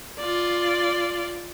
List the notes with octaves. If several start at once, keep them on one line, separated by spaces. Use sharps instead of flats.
F4 D5